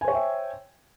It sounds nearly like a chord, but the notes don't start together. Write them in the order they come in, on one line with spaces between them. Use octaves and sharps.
G#5 C5 C#5 G5 E5